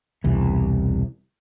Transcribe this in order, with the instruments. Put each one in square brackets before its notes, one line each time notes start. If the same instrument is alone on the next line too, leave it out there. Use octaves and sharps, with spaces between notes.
[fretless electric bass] E1 C2 E3